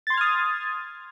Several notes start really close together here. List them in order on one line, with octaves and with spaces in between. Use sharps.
A6 C6 G#6 F6 D#6